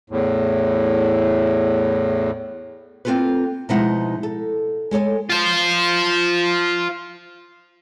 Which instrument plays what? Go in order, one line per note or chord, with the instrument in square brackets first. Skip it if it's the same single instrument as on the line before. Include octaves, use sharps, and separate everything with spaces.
[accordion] E2 A2
[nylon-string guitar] A#3 C4 D#4 F4 A4 B4
B2 F3 G#3 D#4 E4 F#5
A4
G#3 A4 C#5 G#5
[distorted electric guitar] F4 C5